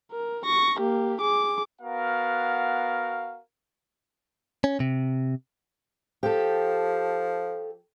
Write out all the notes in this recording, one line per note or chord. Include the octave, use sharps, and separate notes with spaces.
A#4
C#6 A#6
A#3 G4
G#4 D6
B3 F#4 A#4 F5
C#4
C3
F3 G4 A4